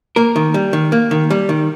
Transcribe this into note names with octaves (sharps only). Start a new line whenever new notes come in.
A#3 A#4
D#3
G3
D#3
A#3
D#3
G3
D#3